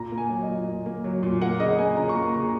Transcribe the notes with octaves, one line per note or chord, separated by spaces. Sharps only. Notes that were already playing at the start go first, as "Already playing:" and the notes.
Already playing: A#2 A#5
A#3
G#5
F#3
D#5
A#2
A#2
A#3
F#3
A#2
A#3 F#5
C#3 D#5
A#3 G#5
C#3 A#5
C#6
A#3 A#5
C#3 A#5